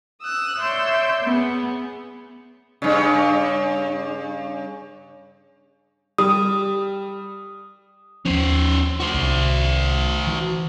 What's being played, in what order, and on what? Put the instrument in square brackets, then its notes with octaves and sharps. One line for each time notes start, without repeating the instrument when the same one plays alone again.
[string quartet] D#6 E6 F#6
C#5 D5 E5 C6 E6 G6
B3 G#4
[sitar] G2 C#3
[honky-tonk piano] G3 [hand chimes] D#6
[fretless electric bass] D#2 F3 [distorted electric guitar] C#4 C5
[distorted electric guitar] F#4 C5
[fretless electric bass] C2
D#3 E3